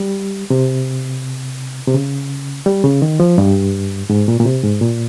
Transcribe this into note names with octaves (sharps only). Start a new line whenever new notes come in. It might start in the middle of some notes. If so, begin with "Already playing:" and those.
Already playing: G3
C3
C3
C#3
G3
C#3
D#3
F3
G2
G#2
A#2
A#2
C3
G#2
A#2